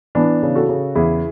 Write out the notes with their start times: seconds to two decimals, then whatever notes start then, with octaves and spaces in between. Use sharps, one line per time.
0.15 E3 B3 D4
0.43 C#3
0.55 F#4 A4
0.69 C#3
0.95 E2 E4 G#4